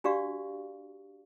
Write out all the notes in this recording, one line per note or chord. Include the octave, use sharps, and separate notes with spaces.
D4 F#4 G4 D5 F5 C#6